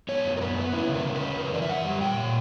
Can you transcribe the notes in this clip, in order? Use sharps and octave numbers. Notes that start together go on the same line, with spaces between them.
B3 C#5
F#2
A#4
B3 B4
B3
C#4 E4
C#3
A#4
C#3
B4
C#4
F#2 A#4
E3 D5
E5
F#2 F#5
G3
A#2 G5
A#2